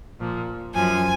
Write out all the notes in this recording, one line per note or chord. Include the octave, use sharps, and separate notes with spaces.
A#2 F3
F#2 F3 G#5